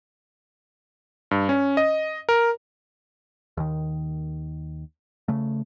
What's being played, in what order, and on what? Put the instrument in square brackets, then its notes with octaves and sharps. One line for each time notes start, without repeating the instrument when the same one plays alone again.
[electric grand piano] G2
C#4
D#5
A#4
[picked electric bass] D#2 D#3
C#3 A3